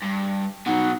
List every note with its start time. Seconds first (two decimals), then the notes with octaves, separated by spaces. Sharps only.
0.02 G2
0.66 B2 F#3 D#4 F#5